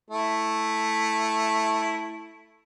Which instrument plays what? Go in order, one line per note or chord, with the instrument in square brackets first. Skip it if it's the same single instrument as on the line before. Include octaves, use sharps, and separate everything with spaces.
[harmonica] A3 E4